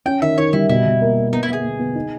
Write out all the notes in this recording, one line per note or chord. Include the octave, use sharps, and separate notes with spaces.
C#4 G5
D#3 E5
D#3 C#5
G3 E4
B2 E4
B2
A#3
A#3
B3 D#4
E4
B3 G#4
B3
B3
D#4